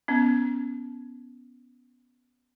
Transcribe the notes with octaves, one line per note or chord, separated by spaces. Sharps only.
B3 C#4